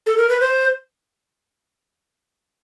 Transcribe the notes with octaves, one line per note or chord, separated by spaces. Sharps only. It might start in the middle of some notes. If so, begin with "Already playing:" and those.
A4
A#4
B4
C5